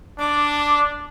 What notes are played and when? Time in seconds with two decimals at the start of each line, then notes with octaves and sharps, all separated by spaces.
0.19 D4 D6